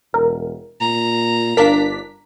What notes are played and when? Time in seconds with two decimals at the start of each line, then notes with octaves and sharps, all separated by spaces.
0.14 E1 A#4
0.81 A#2 A#5
1.57 G1 D4 A#4 F5 B6